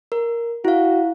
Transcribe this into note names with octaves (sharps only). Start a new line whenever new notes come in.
A#4
E4 F#4 F5